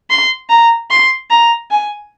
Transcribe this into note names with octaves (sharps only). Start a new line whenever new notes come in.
C6
A#5
C6
A#5
G#5